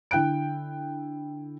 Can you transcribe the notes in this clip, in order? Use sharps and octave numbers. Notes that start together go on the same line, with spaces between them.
D3 E4 G5 F#6 D7